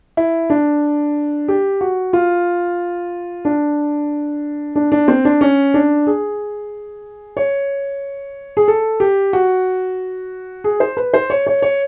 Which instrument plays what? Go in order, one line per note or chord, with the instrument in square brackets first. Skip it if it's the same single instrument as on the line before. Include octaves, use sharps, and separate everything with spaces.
[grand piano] E4
D4
G4
F#4
F4
D4
D4
D4
C4
D4
C#4
D4
G#4
C#5
G#4
A4
G4
F#4
G#4
C5
B4
C5
C#5
C#5
C#5